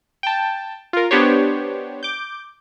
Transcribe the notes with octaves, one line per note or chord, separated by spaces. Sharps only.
G5 A5
F4 A#4
B3 D4 G4 C5 C#5
D6 G6